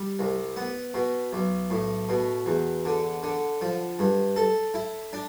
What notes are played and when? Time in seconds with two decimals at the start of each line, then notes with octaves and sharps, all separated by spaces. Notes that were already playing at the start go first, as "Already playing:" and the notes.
Already playing: G3
0.19 C2
0.56 B3
0.94 B2
1.33 B1
1.70 A2
2.09 B2
2.46 E2
2.85 D3
3.23 D3
3.61 F3
3.99 G2
4.36 A4
4.74 E4
5.13 D4